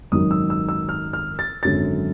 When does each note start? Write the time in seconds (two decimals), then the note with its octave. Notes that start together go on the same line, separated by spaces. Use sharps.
0.12 G#1 F#2 D#3 F#3 D#6
0.31 E6
0.50 E6
0.69 E6
0.89 F6
1.13 F6
1.39 A6
1.63 G#1 F#2 D3 F#3 A6